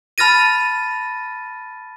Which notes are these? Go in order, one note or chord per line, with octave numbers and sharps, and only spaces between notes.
A5 B5 F6 A6 A#6 D#7